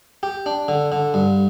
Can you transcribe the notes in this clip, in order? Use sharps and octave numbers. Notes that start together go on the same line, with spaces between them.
G4
D4
D3
D3
G2